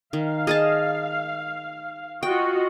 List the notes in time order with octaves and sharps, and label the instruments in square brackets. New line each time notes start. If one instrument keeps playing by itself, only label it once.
[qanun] D#3 [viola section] F5
[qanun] G#4 D#5 A5
[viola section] F4 F#4 D#5 [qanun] G5